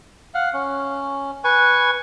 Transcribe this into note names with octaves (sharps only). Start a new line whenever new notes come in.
F5 F#5
C#4
B4 G#5 C#6